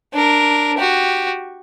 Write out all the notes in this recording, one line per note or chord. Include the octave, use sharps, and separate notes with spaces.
D4 A#4
F#4 G4